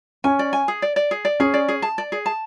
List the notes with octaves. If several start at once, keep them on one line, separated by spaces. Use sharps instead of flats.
C#4 G#5
D5
G#5
G#4
D5
D5
G#4
D5
C#4 G#4
D5
G#4
A5
D5
G#4
A5